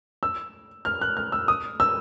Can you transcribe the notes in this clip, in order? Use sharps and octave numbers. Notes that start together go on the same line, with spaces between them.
E6
F6
F#6
F6
E6
D#6
E6